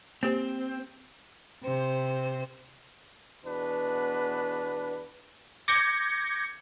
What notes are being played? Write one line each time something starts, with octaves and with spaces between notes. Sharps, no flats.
A#3 C4 G4 C5
C3 C5
E2 B2 D4 B4
D6 G6 G#6 A#6 C#7